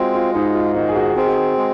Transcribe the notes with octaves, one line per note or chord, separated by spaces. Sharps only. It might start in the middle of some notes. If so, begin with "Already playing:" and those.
Already playing: G#3 C4 F4 F#4
F4
G#2 D#4
F4
D#3 D#4
G#4
F#4
C4 G#4
F#4
G#4
G#3